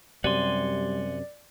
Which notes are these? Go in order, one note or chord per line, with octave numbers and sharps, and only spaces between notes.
F#2 C3 G3 D5 F#5 G#5 C6